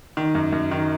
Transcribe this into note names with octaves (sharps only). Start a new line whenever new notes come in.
D#3
F#2
F#2
D#3